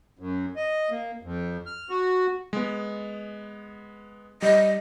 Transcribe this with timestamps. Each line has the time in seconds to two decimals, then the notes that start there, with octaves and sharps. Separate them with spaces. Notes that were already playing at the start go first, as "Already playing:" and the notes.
0.19 F#2
0.56 D#5
0.90 A#3
1.23 F2
1.66 F6
1.89 F#4
2.53 G#3 B3
4.42 G3 D#5